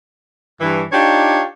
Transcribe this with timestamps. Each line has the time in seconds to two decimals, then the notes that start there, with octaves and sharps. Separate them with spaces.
0.61 G2 E3
0.93 D4 D#4 F4 G4 C#5